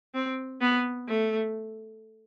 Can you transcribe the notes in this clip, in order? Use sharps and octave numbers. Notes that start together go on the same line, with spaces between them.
C4
B3
A3